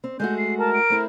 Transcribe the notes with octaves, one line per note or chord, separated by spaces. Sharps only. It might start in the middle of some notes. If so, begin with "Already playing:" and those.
C4
G#3 A3 F#4 G6
C7
A#4 A5
D7
A3 C4 E4